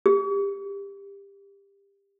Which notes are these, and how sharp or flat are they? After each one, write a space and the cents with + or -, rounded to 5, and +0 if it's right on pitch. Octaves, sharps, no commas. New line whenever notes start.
G4 +25